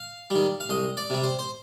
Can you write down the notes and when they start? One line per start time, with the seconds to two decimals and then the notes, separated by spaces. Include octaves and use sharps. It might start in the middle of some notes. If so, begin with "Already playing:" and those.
Already playing: F5
0.30 D#3 G3
0.60 F5
0.69 C2 D#5
0.97 D5
1.10 C3 G3
1.24 C5
1.39 C5